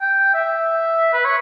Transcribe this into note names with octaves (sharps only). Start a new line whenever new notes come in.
G5
E5
B4
C#5